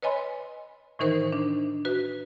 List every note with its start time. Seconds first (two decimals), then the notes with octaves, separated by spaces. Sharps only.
0.02 B4 C#5 D#5 G#5 B5 C6
0.99 A2 D#3 E3 D#4 A#4 C5
1.32 D4
1.85 F#4 B4